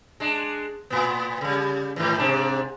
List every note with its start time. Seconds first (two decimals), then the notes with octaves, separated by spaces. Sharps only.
0.20 G#3 D4
0.90 A2 B3
1.41 C#3 G3
1.96 G#2 D#3 E3
2.18 G#2 C3 D4